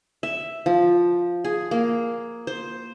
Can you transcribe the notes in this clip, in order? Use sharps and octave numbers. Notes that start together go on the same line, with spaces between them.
E5
F3
G#4
A#3
C5